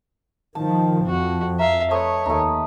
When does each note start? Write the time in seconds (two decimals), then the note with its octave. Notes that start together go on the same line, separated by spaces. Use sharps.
0.55 D#3 F3 A5
1.07 F2 F#4
1.59 E5 F5 A#5
1.91 A3 B4 C#5 D#5
2.26 D#2 A3 D#4